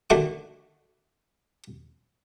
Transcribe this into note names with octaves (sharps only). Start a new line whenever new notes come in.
D3 D#3 A3 F#4 D6